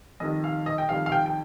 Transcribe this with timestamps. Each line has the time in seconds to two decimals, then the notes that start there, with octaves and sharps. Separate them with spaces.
0.20 F2 D#3 G3 D#5
0.44 F5
0.66 D#5
0.78 G5
0.89 F2 D#3 G3 F5
1.06 F5
1.12 G5
1.26 G5